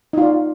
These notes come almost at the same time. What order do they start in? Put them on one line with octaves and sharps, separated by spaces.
D#4 F4 D5